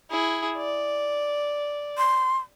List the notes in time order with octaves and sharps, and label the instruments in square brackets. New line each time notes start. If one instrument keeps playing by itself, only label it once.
[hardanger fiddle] E4 G#4
D5
[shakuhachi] C6